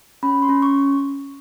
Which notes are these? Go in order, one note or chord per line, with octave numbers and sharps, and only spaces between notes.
C#4 B5
C6
C#4
C#6